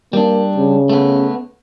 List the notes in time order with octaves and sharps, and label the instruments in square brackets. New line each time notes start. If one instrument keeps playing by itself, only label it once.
[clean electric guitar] G3 D4 [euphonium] A#3
[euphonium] C#3
[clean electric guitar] A3 B3